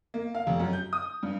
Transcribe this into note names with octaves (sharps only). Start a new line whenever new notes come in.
A#3
F5
F1
F#2
G6
D#6
G2